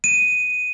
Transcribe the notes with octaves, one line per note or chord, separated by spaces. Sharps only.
D#7